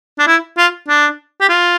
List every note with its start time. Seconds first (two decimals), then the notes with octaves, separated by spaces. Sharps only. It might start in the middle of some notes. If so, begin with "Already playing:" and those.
0.19 D4
0.27 E4
0.57 F4
0.88 D4
1.41 G4
1.49 F4